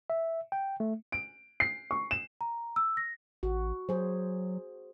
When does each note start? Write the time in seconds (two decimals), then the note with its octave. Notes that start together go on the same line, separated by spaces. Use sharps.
0.10 E5
0.52 G5
0.80 A3
1.12 D7
1.60 C7
1.91 C#6
2.11 E7
2.41 A#5
2.76 E6
2.97 A#6
3.43 A1 F#4
3.89 F#3 G#4 C5